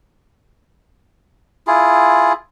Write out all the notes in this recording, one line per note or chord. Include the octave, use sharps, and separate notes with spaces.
E4 F4 G#4